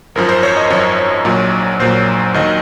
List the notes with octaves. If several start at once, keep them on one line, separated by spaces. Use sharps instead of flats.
G#1 F#2 F3 A#4
C5
C#5
D#5
G#1 F#2 F3 C#5
A#1 A#2 F#3
A#1 A#2 F#3 C5
D#2 D#3 F#3 D#5